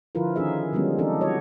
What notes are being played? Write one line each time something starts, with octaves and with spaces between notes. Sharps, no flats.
D3 F3 E4 F4 A#4 B4
D#3 C#4 D#4 G#4 E5
D3 F3 G3 G#3 B3 C#4
E3 C4 D4 D#4 A4
G3 F#4 C#5 D#5